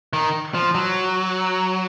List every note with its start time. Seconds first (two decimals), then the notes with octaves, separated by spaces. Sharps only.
0.13 D#3
0.54 F3
0.75 F#3